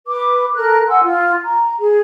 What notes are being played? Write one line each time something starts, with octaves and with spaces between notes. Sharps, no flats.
B4 D6
A4 A#4 F#6
F#5 G#5 C6 E6
F4
A#5
G#4